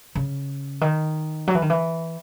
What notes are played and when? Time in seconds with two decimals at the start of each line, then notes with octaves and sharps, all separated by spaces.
0.15 C#3
0.81 D#3
1.48 F#3
1.55 E3
1.62 D#3
1.70 E3